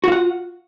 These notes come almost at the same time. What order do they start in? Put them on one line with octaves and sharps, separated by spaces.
F#4 F4 F#5